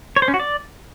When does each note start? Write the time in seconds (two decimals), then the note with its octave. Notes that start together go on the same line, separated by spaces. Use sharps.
0.16 C#5
0.22 C5
0.28 C#4
0.34 F#4
0.40 D5